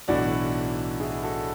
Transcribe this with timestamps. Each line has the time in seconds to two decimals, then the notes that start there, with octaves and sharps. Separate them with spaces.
0.08 B1 A2 E3 D4 F#4
1.00 E4 G#4
1.23 F#4 A4